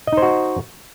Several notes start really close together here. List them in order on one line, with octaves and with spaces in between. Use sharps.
D#5 D#4 C5 F#4